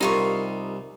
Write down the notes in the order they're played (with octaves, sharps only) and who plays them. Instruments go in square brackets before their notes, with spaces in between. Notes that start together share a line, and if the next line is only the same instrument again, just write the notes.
[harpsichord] C2 [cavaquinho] D#4 F4 C#6 [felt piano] G4 A#4